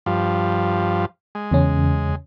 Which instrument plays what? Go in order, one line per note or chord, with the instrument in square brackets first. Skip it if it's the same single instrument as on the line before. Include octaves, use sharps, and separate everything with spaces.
[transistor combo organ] G2 F3
G#3
[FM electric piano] E2 C#3 C#4